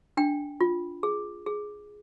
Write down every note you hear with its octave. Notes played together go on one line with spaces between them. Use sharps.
D4 G5
F4
G#4
G#4